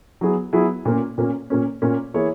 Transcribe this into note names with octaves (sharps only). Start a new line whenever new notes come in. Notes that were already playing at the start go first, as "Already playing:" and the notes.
F#3 B3 E4 G#4
F#3 B3 E4 G#4
A#2 A#3 C#4
A#2 A#3 C#4
A#2 A#3 C#4
A#2 A#3 C#4
E3 A#3 E4 G#4 C#5